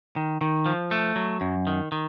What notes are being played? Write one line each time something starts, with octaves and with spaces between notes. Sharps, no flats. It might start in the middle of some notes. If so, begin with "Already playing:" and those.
D#3
D#3
F3
A3
F#3
F#2
D#3
D#3